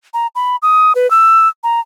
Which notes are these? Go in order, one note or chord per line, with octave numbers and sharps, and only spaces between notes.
A#5
B5
D#6
B4
E6
A#5